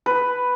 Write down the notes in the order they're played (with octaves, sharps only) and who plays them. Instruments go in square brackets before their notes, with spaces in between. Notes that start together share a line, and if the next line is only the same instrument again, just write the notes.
[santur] B4